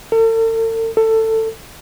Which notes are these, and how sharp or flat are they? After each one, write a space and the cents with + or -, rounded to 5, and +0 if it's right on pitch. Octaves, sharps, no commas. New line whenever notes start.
A4 +45
A4 +20